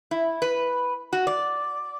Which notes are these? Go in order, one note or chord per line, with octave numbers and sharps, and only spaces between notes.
E4
B4
F#4
D5